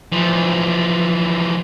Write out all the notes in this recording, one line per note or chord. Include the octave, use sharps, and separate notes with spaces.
E3 F3